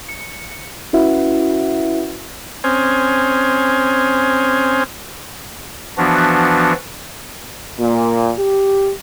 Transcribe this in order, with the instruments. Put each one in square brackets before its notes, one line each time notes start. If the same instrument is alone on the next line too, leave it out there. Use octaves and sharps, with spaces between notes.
[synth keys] C#7
C#4 E4 F#4 B4 E5 F#5
[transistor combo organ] C4 C#4 C5 G#5 D#6 F6
[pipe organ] E3 F3 B3 D4 F#4
[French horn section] A#2
G4